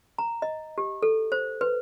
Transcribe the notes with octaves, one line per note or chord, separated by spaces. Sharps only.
A#5
D#5
G4
A4
C5
B4